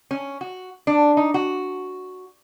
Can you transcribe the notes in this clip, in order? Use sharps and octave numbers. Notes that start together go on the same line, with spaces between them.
C#4
F#4
D4
D#4
F#4